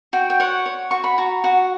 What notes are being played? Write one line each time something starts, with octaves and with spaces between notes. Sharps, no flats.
F#4 G5
G5
C#5 F#5
C#5
F#4 C#6
B5
F#4 A#5
F#4 F#5